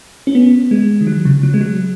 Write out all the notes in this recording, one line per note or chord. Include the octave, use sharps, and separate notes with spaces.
C#4
B3
G#3
D#3
F#3
C#3
F#3
G#3
F#3